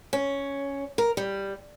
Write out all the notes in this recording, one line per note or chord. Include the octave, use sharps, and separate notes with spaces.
C#4
A#4
G3